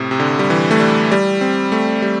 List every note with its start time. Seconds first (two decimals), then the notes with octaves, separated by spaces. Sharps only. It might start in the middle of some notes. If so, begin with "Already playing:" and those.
Already playing: A2 C3
0.11 C3
0.20 D3
0.39 G3
0.50 E3
0.71 A3
0.80 G3
1.12 G3
1.41 C4
1.72 A3
2.02 G3